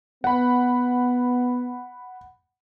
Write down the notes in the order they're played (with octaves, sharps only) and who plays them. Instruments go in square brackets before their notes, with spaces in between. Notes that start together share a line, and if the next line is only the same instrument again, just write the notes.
[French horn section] B3 [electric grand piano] F#5 B5